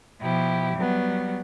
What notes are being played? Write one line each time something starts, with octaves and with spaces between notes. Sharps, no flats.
B2 F3 E4 G4
F#3 G3 B3